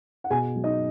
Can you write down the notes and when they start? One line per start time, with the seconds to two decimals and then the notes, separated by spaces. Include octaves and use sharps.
0.24 F#5
0.30 B2 G#4 G#5
0.56 F#3
0.64 D#4 D#5